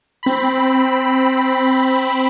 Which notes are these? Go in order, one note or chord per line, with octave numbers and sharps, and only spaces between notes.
C4 B5